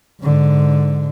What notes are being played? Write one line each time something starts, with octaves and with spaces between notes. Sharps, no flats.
G#2 D3